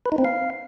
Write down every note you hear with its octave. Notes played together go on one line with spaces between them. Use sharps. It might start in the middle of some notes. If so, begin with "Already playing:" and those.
B4
D#4
C4
F5